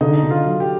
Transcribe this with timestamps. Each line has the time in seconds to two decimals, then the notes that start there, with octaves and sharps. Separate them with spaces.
0.01 D3 D#4
0.23 D3
0.30 F4
0.45 F#3
0.60 G4